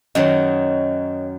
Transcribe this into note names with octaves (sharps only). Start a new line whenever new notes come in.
F#2 D#3 F#3 C#5 D#5